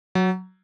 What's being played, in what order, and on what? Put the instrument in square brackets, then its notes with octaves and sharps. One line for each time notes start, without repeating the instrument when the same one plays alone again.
[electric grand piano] F#3